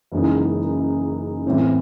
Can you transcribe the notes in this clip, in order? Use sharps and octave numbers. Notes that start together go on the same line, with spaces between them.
F#1 F#2 E3 G#3 D#4
A2 E3 C4 E4